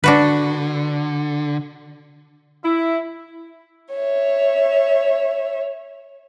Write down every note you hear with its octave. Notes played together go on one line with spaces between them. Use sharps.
D3 D4 F#4 B4
E4
C#5 E5